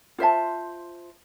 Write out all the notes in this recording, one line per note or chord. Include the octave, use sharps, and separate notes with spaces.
F4 C5 E5 A5